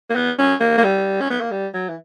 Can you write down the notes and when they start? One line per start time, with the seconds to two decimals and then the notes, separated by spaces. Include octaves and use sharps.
0.10 A#3
0.15 B3
0.39 C#4
0.60 A#3
0.78 A#3
0.83 G3
1.21 C#4
1.30 B3
1.41 A#3
1.51 G3
1.73 F#3
1.89 E3